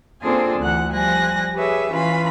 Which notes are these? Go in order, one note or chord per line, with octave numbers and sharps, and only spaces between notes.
A#3 C4 D4 F4 G#4 A4
D2 E3 F#5 F#6
F3 G3 G#5 F#6 A#6
G4 G#4 B4 C#5 E5
E3 C#4 F4 B4 B5